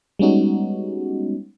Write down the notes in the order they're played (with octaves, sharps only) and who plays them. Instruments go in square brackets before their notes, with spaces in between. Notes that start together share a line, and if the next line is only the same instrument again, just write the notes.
[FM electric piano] G3 G#3 B3 C#4 D#4 F#4